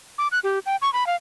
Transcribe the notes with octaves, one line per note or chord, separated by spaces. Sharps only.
D6
F#6
G4
G5
C#6
B5
F5